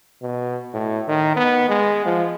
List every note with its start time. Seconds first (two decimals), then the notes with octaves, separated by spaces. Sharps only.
0.22 B2
0.74 A2
1.08 D#3
1.37 B3
1.69 G#3
2.06 F3